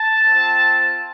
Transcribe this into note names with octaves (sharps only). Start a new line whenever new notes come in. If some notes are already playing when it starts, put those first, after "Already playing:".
Already playing: A5
C4 F4